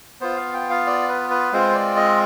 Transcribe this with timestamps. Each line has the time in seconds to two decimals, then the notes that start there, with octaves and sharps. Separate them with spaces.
0.21 B3 F4 C5
0.37 F5
0.54 G5
0.70 F5
0.87 D5
1.08 B4
1.30 B4
1.53 G#3 C4 F4 C5
1.74 D5
1.96 D#5